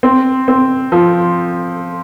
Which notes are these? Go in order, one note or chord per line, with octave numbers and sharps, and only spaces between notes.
C4
C4
F3